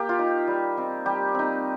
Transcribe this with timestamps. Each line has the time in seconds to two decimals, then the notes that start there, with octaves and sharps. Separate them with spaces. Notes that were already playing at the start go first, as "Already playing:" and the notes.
Already playing: A#3 G4
0.09 F4
0.19 D#4
0.48 G3
0.77 C4 D#4
1.06 G3 G4
1.35 C4 D#4